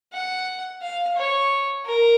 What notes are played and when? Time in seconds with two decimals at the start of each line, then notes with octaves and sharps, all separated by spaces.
0.13 F#5
0.82 F5
1.16 C#5
1.86 A#4